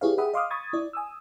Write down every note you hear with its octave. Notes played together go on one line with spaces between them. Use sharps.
E4 G4 G#4 B4 C#5 F5
G#4 E5 F#5 G5 B5 D#6
D#5 F5 C6 D6 D#6 F6
B5 C#6 D#6 G#6 A6
E4 D5
G#5 D#6 E6